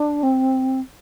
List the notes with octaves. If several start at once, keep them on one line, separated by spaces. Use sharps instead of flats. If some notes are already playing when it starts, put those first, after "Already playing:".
Already playing: D4
C4